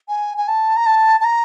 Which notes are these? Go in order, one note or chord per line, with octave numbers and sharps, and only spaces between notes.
G#5
G#5
A5
A#5
A5
A5
A#5